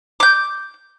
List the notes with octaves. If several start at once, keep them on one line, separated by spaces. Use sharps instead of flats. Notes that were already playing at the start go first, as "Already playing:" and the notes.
D6 G6